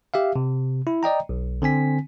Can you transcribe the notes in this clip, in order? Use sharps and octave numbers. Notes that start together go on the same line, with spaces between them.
G4 E5 F5
C3
E4
D5 D#5 G5 A#5
B1
D3 C4 G#5 B6